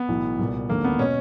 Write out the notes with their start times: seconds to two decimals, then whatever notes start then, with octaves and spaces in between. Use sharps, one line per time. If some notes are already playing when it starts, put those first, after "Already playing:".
Already playing: B3
0.08 B1 A2 E3
0.39 C2 A#2
0.69 E1 D#2 D3 A#3
0.84 B3
0.99 B2 C#4